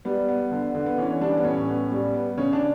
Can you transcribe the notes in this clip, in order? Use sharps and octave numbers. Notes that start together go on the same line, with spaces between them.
G3 B3
B3
D3
D3
B3
E3 C#4
C#4
G3 D4
B3
A2 C#4
B3
G3
B3
C#3 C#4
D4